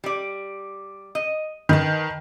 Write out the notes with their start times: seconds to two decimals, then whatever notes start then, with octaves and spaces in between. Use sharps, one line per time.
0.04 G3 D5
1.15 D#5
1.69 D#3 B4 A5